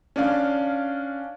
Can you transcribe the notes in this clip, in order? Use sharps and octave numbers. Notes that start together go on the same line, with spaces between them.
C#4 D4 D5 F5